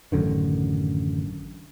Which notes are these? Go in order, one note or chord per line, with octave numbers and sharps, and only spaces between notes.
A1 F#2 D3 D#3